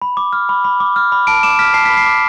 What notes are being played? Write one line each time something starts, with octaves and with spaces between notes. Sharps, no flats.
B5
D6
F6
B5
B5
D6
F6
B5
A5 D7
D6 E7
F6 B6
A5 C7
B5 B6
C7
D6